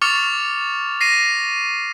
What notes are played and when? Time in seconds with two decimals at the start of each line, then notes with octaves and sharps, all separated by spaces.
0.02 C#6 D6 F6 A6 C#7 F7
1.01 A#6 C7 D#7